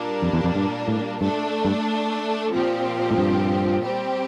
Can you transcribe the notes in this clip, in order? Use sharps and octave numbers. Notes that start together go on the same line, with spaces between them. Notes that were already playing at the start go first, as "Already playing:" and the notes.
Already playing: A#2 G3 A#3 D4
F2
E2
F2
G2
A2
G2 A3 D4 A4
G2
A#2 F3 C4 G4
A2
G2
G3 C4 G4